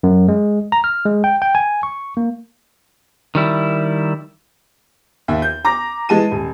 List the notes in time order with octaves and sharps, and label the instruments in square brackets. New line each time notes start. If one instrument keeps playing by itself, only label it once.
[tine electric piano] F#2
G#3
A#5
F6
G#3
G5
G5
G#5
C#6
A#3
[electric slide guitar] D#3 G3 E4
[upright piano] D#2 E5
G6
A#5 D6 A#6
E3 G#3 A5 D#7
D#1